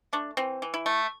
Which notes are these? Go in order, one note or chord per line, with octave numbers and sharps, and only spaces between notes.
A3 D4
E3 C4
E3
E4
A3